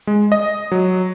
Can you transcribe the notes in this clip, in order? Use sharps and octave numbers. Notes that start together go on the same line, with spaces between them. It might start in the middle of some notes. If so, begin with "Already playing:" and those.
G#3
D#5
F#3